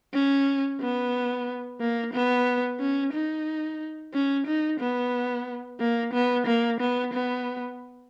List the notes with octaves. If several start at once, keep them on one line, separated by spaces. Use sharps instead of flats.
C#4
B3
A#3
B3
C#4
D#4
C#4
D#4
B3
A#3
B3
A#3
B3
B3